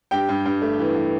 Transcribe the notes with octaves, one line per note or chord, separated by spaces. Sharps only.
G2 G4 G5
G2
G2
A3
E3
E3